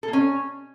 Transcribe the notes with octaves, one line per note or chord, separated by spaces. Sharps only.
A4
A#3
C#4